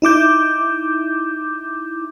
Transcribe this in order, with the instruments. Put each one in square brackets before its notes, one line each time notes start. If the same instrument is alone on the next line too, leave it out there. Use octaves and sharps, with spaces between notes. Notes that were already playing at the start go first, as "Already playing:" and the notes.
[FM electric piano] D#4 E4 D6 G6